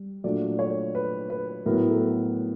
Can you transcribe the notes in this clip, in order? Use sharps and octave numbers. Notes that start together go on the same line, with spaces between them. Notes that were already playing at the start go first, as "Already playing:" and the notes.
Already playing: G3
A#2 F#3 A3 D4 D5
C#5
B4
B4
A2 F#3 B3 E4 A#4
A4